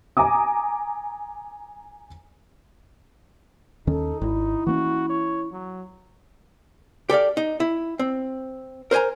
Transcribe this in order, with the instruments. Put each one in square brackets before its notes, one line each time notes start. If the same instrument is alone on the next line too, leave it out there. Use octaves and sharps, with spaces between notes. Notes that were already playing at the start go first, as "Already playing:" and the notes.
[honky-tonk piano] G#5 A#5 D6 D#6
[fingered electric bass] D#2 D#3 C#4 [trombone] D#4 [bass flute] A4
[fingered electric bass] G#1 [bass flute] E4
[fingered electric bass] E3 A#3 C#4 [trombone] F#4
[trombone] C#5
F#3
[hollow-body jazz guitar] G4 A4 D5 F5
D#4
E4
C4
A#4 C5 C#5 G#5 A#5